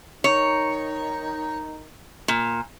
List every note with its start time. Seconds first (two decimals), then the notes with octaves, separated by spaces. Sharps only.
0.24 D#3 D#4 C#5
2.28 A#2